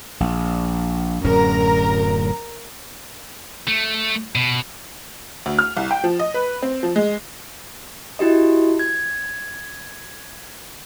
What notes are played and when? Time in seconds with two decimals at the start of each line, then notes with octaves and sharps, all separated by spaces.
0.20 A#1
1.24 D1 F#2 C#4 A#4 A#5
3.68 A3
4.35 B2
5.46 D2
5.59 F6
5.77 C2
5.91 G5
6.04 F3
6.19 D#5
6.34 B4
6.62 C4
6.83 F3
6.96 G#3
8.19 E4 F#4 G4 D#5
8.79 G#6